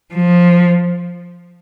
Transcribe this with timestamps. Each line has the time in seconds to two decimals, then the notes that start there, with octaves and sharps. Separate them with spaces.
0.14 F3